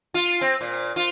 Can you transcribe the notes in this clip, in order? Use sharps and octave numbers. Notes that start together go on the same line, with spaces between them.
F4
C4
A#2
F4